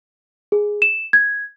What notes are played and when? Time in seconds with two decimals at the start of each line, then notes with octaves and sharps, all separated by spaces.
0.52 G#4
0.82 E7
1.13 G#6